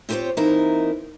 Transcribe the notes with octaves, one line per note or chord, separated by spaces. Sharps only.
C4 F4 G4 A#4 C5 C#5
E3 A#3 C4 D#4 E4 A#4